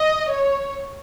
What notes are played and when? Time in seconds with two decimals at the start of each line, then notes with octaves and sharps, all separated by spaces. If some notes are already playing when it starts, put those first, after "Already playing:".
Already playing: D#5
0.31 C#5